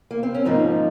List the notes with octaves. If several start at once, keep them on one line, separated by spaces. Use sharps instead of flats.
A#3
C4
C#4
G#2 F3 A#3 D#4